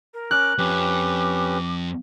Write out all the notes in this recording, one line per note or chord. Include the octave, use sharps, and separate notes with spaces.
A#4
C#4 D6 F6 F#6
F2 C#4 G4 B4 D6